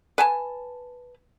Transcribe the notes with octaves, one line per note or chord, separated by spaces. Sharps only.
B4 G#5 A5